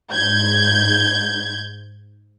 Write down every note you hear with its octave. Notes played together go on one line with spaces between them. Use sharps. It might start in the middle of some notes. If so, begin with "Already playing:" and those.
G#2 G6 G#6